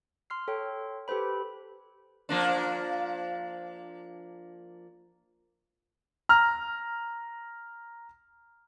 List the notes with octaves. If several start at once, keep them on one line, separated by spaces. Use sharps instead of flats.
C6 F6 C7
A4 C#5 G5 C6
G4 A4 B4 C5 B5
F3 A#3 D4
A#5 F6